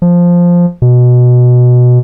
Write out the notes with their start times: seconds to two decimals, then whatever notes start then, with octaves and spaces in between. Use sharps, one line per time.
0.02 F3
0.82 B2